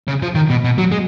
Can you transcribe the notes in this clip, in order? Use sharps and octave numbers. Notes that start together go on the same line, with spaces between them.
C#3
F3
D#3
B2
B2
F#3
G#3